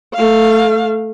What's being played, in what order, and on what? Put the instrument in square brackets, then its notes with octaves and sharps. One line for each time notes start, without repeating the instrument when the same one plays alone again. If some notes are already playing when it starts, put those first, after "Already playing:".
[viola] A3 F5